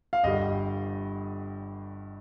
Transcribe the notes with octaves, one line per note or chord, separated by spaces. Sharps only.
F5
G1 G2 D3 G3 D#5